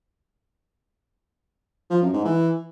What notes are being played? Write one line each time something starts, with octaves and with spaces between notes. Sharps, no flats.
F3
F#2
G#2
E3